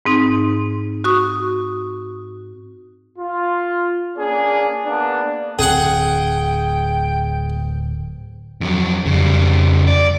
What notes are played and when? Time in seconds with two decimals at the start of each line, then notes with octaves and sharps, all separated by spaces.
0.06 G#2 C4 D#4
1.04 F#4 C#6 D#6
3.19 F4
4.17 A#3 C#4 D4 G#4
4.86 A#3 B3 D4
5.59 D1 C4 G#4 F#5 G5
8.61 F2 F#3
9.06 F2 C#3 G3
9.87 D5